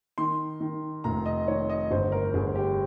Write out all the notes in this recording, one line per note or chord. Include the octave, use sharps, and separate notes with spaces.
D#3 C6
D#3
F1 A#5
D#5
D#3 C#5
D#5
G1 C5
A#4
G1 G#4
G4